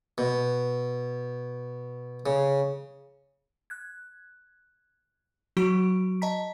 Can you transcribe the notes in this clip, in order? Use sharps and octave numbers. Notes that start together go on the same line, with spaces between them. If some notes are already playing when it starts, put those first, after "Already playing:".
B2
C#3
F#6 G#6
F#3 F#4 C#6 D7
D#5 A5 A#5 B6